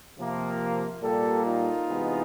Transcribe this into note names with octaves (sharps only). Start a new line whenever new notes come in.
C3 F3 A#3
A#2 G3 A#3 G4 A4
D#4 F4
C3 E3 G#3 B3